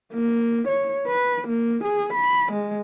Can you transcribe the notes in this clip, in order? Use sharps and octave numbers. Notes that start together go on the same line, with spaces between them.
A#3
C#5
B4
A#3
G#4
B5
G#3